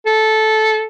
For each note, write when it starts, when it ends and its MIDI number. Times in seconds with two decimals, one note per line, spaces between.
0.06 0.86 69